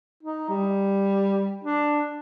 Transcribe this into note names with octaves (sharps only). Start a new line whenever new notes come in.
D#4
G3
D4